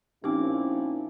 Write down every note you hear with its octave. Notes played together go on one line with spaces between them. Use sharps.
A#2 F3 C4 C#4 D#4 E4 G4 D6